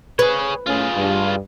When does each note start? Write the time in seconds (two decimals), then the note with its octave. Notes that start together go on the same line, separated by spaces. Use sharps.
0.19 G#4 B4 C#5
0.67 A2 A3 C#4 F4 G#4
0.97 G2